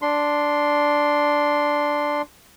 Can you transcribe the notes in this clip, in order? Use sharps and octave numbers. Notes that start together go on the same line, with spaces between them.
D4 C6